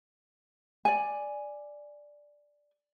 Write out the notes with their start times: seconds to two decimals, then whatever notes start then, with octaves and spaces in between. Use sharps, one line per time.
0.85 D5 G#5